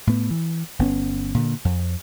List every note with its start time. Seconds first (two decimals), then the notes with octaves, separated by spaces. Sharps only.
0.07 A2 B3
0.31 E3
0.79 G1 B3 C#4
1.34 A#2 D3
1.65 F2